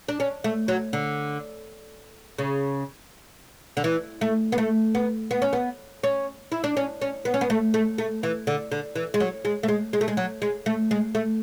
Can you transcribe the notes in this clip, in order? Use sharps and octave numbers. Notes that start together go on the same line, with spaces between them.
D4
C#4
A3
F#3
D3
C#3
D3
E3
A3
B3
A3
B3
B3
C#4
B3
C#4
E4
D4
C#4
C#4
B3
C#4
B3
A3
A3
A3
E3
D3
D3
E3
G#3
F#3
G#3
A3
G#3
G#3
A3
G#3
F#3
G#3
A3
G#3
A3